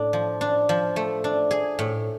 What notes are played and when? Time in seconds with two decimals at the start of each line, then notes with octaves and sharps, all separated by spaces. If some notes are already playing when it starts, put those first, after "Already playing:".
Already playing: A2 D4
0.13 F3
0.41 D4
0.69 F3
0.96 A3
1.24 D4
1.51 G#4
1.79 A2